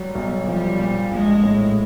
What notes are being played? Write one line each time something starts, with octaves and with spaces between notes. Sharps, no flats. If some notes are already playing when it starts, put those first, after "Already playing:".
Already playing: F#3 G3
B1
F3 G3
A#2
A#1 G#3
A2